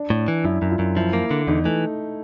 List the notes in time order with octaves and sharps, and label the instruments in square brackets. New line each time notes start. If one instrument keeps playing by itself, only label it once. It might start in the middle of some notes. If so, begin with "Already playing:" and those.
Already playing: [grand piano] D4
[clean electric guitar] A2
E3
[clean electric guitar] F#2 [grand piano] E4
[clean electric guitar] F#2
[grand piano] F4
[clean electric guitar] F#2
[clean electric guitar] F3 [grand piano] E4
[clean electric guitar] A#3
D3
[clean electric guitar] E2 [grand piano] D#4
[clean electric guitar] E3 [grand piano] A3